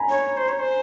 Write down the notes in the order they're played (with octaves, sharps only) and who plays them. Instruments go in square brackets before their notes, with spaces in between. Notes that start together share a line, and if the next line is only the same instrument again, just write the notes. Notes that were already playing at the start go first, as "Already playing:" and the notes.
Already playing: [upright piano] G#5 A#5 B5
[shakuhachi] C#5
C5
C#5
C5